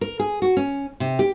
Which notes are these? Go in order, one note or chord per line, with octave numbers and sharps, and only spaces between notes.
A#4
G#4
F#4
C#4
C3
G4